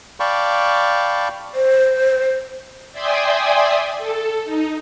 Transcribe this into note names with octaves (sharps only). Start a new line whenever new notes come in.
D5 F5 G5 A5 B5 C#6
C5
D5 E5 G5 G#5 C6 D#6
A4
D#4